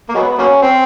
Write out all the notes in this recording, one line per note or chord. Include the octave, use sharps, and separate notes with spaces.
A#3
F#3 G#3 B3
F#3 A#3 C#4
C4